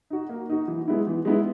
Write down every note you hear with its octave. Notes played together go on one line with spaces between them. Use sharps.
D#4 F#4
A#3
D#4 F#4
E3
G#3 B3 E4
E3
G#3 B3 E4